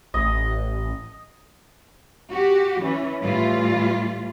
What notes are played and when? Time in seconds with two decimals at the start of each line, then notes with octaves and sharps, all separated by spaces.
0.14 A1 D#5
2.30 F#4 G4
2.83 E3 C#4
3.19 A2 E3 G3 F4